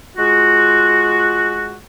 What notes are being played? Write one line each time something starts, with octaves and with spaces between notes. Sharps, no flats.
G#3 F4 F#4